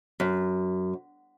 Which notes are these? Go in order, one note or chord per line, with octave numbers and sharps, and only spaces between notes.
F#2